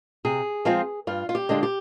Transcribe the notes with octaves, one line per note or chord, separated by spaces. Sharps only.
C3 G#4
F3 G#3 C4 F4
G2 F4
F4
G4
D3 G#3 D4 F4
G4